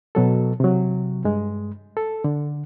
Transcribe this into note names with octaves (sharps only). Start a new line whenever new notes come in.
B2 F#3 A4
C3 F#3
G2 G#3
A4
D3